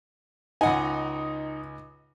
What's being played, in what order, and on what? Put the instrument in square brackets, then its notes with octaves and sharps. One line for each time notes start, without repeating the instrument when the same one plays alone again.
[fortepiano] C#2 F#5 G#5 [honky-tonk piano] D#4